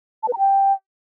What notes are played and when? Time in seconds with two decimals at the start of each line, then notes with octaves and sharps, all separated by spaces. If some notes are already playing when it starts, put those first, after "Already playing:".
0.23 A5
0.28 B4
0.33 A#5
0.38 G5